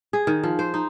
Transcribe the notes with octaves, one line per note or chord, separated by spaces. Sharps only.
G#4
D#3
F3
C5
D#4